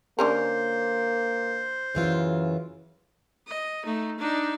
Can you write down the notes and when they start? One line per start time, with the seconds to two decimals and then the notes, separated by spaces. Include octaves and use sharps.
0.19 D3 A#3 C#4 A#4 C5
1.95 F#2 C#3 E3 F4
3.47 D#5
3.84 A3 D#4
4.19 D4 D#4